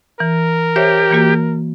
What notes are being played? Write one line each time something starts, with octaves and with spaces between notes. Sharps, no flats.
E3 A#4
G4 C5 C#5 E5
E3 A#3 F#4